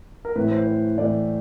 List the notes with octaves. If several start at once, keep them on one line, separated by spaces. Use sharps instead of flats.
A#4
A2 E3 A3 B4
C5
C5
A2 E3 A3 D5